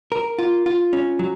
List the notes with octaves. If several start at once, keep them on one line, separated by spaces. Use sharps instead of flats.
A#4
F4
F4
C#4
F#3